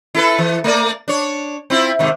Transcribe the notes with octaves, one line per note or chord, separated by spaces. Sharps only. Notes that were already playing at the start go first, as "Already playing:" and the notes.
E4 A4 B4
E3
A3 A#3 D5
D4 C#5
C4 E4 F4
G#2 C3 D#3